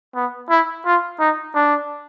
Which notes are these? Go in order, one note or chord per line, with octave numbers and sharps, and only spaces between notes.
B3
E4
F4
D#4
D4